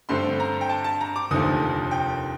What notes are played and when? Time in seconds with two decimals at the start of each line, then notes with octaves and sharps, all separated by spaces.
0.09 G2 D3 A3 C4 C6
0.40 A#5
0.61 G5
0.69 A5
0.84 A5
1.01 A#5
1.16 D6
1.31 F1 D#2 D3 F3 A3 D#6
1.91 G5